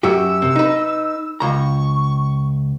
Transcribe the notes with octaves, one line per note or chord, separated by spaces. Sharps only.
F#2 F#4 G4 E6
C3
D#4 B4
C#2 A#5 C#6